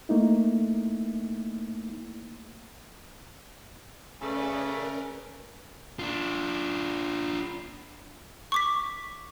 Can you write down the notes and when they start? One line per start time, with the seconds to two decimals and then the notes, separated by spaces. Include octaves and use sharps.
0.09 A3 A#3 D#4 E4
4.21 C#3 A3 C#4 B4 D5
4.62 A#4
5.99 D4 F4
8.52 C#6 D6 B6